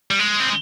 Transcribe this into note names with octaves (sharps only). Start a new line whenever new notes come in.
G3
G#3
C4